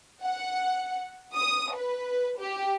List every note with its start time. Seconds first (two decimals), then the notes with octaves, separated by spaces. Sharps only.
0.23 F#5
1.35 D#6
1.75 B4
2.40 G4